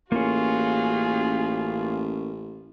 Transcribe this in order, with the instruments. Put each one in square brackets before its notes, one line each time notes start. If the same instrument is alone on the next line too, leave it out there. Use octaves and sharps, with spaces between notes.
[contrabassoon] A1 [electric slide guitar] A#3 C#4 [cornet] F4 [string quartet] F#4 G#4